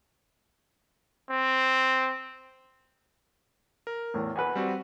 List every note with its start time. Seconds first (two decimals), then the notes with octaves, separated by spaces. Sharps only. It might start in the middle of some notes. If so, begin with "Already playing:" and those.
1.31 C4
3.87 A#4
4.14 E2 A2
4.35 E2 B4 F#5 G#5
4.55 G3 C4 F#4